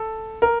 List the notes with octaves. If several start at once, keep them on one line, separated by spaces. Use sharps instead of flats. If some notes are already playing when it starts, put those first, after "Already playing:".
Already playing: A4
A#4